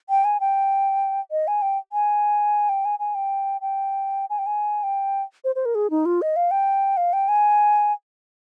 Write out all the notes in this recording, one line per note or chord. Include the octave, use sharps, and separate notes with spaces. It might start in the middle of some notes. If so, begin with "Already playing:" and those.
G5
G#5
G5
D#5
G#5
G5
G#5
G5
G#5
G#5
G5
G5
G#5
G5
G#5
G5
C5
C5
A#4
G#4
D#4
F4
D#5
F5
G5
F5
G5
G#5